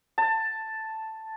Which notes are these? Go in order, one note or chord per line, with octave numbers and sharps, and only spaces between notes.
A5